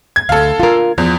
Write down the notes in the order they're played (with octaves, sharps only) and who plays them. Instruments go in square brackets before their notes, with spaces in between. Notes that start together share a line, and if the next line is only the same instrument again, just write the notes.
[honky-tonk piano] G#6
[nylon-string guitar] D2 [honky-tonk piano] A4 F5
[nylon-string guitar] F4 A#4
[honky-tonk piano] E2 [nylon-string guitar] F3